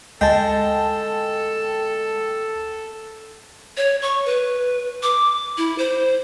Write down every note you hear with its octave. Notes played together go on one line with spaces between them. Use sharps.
D2 G#3 A4 G5 A5
C#5
C#6
B4
D6
E4
C5